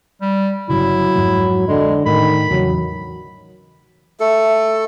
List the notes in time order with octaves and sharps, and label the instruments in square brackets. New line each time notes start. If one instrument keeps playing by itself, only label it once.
[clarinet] G3
[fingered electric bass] G1 C#3 [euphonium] F#3 [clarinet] E4
[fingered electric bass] F2 G#2 F3
[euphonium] D3 [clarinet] G#3
[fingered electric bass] A2 [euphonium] D#3 [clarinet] B5
[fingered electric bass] E2 C#3 E3 [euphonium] F#3
[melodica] A3 A4